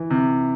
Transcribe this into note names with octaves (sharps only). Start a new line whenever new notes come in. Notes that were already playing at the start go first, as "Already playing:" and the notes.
Already playing: E3
C3